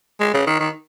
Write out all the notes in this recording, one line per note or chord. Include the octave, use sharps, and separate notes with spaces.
G#3
C#3
D#3
D#3